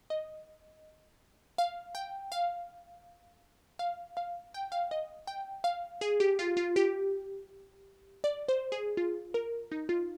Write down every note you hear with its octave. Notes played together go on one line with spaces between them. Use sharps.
D#5
F5
G5
F5
F5
F5
G5
F5
D#5
G5
F5
G#4
G4
F4
F4
G4
D5
C5
G#4
F4
A#4
D#4
F4